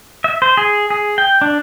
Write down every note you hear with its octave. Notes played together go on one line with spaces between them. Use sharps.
E5
C5
G#4
G#4
G5
D4